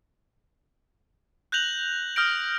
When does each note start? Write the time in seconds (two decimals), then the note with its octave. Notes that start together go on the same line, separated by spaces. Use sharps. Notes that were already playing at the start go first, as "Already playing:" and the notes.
1.52 F#6 G6 A#6 F7 F#7
2.16 D#6 F6 G6 A#6 D7